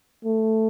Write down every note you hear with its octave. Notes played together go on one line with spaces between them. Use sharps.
A3